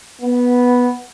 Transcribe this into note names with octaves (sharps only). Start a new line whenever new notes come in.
B3